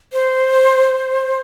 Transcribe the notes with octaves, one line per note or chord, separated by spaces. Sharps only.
C5